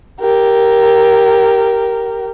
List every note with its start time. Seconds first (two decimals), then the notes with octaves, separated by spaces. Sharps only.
0.20 G4 A#4